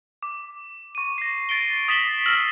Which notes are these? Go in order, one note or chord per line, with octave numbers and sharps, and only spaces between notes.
D6
C#6 D#7
A#6 C7
A6 C7 D7 G7
D#6 A6 B6 E7 F#7 G7
E6 F6 A6 A#6 E7 F#7